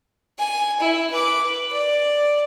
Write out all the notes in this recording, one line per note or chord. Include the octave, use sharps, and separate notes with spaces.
G#5
E4
B4 D6
B4
D5